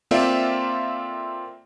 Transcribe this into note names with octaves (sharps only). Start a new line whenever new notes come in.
A#3 C4 F4 A4 D5 E5